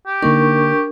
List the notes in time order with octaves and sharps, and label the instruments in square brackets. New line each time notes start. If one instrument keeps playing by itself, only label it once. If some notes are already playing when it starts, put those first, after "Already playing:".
[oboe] G4
[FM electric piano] D3 A#3 D#4 [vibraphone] D4 A#4 C#6